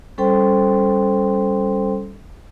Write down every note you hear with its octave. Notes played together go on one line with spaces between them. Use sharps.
G3 C#4 A4 C5 G5 C6